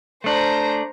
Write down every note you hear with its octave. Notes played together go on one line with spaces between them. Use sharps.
A3 D4 C5 A#5